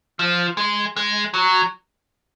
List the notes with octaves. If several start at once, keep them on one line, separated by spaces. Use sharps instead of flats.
F3
G#3
G#3
F#3